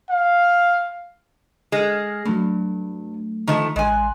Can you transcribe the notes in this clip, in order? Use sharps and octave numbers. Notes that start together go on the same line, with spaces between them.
F5
G#3 F6 A#6 C7
G2 F#3 A3
D#3 F3 A3
A1 G#3 G#5 C6 F#6